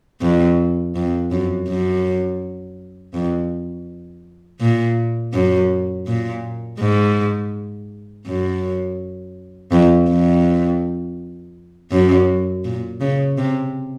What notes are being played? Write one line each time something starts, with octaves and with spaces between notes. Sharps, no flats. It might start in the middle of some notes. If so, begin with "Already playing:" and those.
F2
F2
F#2
F#2
F2
A#2
F#2
A#2
G#2
F#2
F2
F2
F#2
A#2
C#3
C3